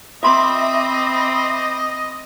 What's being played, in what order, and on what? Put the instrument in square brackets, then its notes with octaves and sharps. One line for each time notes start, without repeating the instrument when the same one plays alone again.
[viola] C4 [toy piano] F4 C6 [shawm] D#5 [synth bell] E5 B5 D6